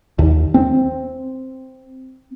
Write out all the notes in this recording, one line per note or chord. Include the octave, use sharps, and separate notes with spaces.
D#2
C4